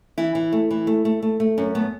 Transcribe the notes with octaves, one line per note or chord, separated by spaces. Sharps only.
E3 E4
E3
A3
E3
A3
A3
A3
A3
F#2 C#4
A3 B3